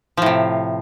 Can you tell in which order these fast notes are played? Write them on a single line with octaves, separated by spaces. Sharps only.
F3 A2 C3